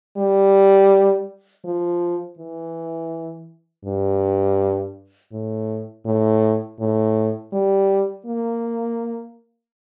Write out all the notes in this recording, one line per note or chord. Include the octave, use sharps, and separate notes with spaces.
G3
F3
E3
G2
A2
A2
A2
G3
A#3